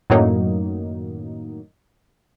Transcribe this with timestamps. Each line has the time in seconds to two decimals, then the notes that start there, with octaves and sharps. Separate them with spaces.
0.10 F#2 A2 D#3 F#3 A#3 D#4